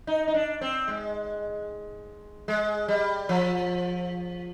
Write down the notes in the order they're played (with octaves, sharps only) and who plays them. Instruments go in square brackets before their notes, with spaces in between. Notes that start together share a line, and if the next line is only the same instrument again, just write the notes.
[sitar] D#4
D#4
D4
C4
G#3
G#3
G3
F3